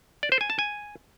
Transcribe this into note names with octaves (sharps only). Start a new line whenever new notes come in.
D5
C5
G#5
A5
G#5